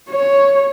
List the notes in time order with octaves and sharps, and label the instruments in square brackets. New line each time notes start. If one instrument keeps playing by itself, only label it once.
[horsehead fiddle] C#5